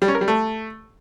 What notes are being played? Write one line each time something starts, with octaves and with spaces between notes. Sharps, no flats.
G3
C#4
A#4
G3
A3